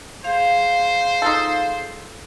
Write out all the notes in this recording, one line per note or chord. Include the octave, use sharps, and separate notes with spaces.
G#4 C5 F5
D#4 F4 A4